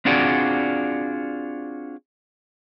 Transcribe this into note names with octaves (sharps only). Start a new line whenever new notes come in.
C4 D4 F4 F#4 G#4 D5